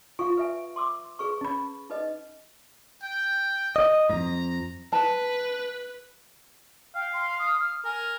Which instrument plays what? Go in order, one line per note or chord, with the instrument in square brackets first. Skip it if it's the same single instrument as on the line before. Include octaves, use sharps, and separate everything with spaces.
[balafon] F4 [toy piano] F5 C#6
[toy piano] B4 E5 G#5
C6 D6 E6
G#4 B4 C#6
[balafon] C#4 B5
[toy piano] D#4 B4 D#5
[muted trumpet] G5
[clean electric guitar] D#5
[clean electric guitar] F2 G#2 [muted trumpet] A#5
[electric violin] B4 [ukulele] A5
[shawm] F5 [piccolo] G5
[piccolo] C6
D#6
F6
[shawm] A#4 [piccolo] G#5